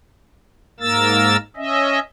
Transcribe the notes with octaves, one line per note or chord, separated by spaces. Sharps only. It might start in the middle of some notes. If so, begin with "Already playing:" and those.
G#2 A#3 A#4 E6 A6
C#4 D#5 E5